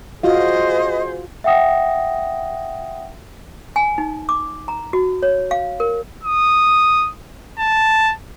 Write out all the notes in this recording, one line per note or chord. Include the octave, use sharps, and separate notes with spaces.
F4 F#4 G#4 C5 D#5 F5
E5 F#5 G5 D#6 A#6
G#5
D#4
D6
A#5
F#4
C#5
F5
A#4
D#6
A5